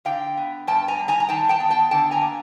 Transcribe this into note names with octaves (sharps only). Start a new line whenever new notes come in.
D3 F5 G5
B3
G2 G5 A5
G#5 A#5
G3
G#5 A#5
A#5
D#3 G5 A5
G5 A5
B3
G5 A5
D3 G5 A5
G#5 A#5
A#3